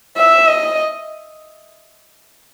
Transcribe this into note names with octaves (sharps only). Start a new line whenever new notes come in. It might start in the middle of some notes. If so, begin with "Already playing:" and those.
E5
D#5